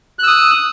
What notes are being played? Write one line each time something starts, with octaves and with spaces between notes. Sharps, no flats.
D#6 E6 F#6